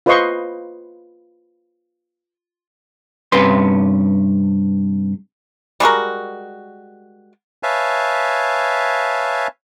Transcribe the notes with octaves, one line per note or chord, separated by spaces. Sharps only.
F4 B4 C5 D#5 C6 C#6
G2 C3 C#4 B4 C6
G3 G#3 F#4 A#4
B4 C#5 E5 F5 G#5 A5